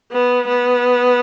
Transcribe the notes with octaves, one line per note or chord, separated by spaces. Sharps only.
B3
B3